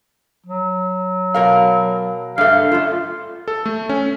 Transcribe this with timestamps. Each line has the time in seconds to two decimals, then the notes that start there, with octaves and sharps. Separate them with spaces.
0.47 F#3
1.34 B2 A#4 F5
2.38 G2 A3 F5
2.72 F#2 A3 F4
3.48 A4
3.66 A3
3.89 C#4